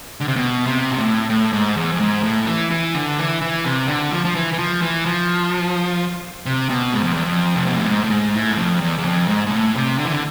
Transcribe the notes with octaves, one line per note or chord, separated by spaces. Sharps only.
D3
C3
B2
C3
B2
A2
A2
G#2
E2
F2
G#2
A2
E3
E3
D3
E3
E3
C3
D3
F3
F3
E3
E3
F3
E3
F3
C3
B2
G#2
F2
E2
F2
C3
B2
A2
G#2
A2
G#2
A2
G#2
F2
E2
E2
F2
G#2
G#2
A2
C3
D3
E3
D3